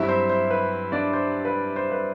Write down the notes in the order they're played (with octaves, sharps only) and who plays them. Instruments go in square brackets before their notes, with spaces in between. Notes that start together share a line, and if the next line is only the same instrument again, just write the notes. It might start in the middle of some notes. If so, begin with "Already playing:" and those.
Already playing: [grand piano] G2 F#3 C4 E4 E5
C5
C5
B4
D4 D5
C5
B4
C5
B4